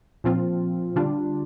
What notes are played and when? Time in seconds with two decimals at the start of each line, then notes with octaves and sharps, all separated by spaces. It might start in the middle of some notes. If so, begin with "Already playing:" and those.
0.24 A#2 F3 C4 F4
0.96 D3 G3 D4 F4